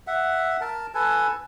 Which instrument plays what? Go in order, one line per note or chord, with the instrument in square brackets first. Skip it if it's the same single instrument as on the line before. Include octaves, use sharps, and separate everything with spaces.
[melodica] E5 F#5
A#4 A5
A4 B4 G#5 A5